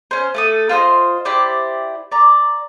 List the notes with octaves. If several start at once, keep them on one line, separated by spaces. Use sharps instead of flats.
C#4 C5
A3 A4 D#6
F4 C5 C#5 D#5
E4 G4 C5 D5
D5 A#5